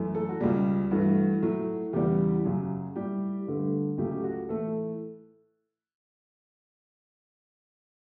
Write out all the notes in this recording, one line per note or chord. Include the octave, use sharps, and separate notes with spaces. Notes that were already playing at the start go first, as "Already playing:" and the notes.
Already playing: F#2 E3 A3
A4
F#4
C#2 C#3 G3 G4
G2 E3 A3 F#4
A2 F#3 A3
E2 C#3 E3 G3 G4
F#2 C#3 F#3
A2 G3 G4
G2 D3 A3
C#2 C#3 F#3 A3 G4
G4
F#4
A2 E3 A3 A4